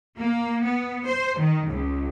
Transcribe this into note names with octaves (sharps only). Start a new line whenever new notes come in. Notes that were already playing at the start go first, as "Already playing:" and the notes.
A#3
B3
C5
D#3
C#2